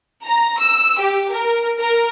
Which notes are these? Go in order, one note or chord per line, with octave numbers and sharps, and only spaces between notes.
A#5
E6
G4
A#4
A#4